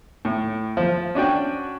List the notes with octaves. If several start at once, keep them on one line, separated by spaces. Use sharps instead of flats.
A2
F3
C#4 D4 F#4 G5